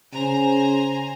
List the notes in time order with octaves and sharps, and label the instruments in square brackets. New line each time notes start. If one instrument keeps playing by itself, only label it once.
[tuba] C#3 [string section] C5 G#5 A#5